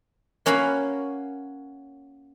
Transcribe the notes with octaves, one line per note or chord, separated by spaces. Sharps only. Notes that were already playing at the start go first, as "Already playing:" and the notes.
A#3 C#4 F#4 F5 B5